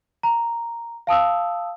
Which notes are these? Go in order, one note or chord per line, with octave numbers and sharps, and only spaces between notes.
A#5
F5 A5 D#6 E6